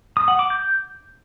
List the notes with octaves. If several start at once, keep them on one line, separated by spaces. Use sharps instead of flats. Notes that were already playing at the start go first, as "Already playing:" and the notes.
D#6
F#5
D6
G6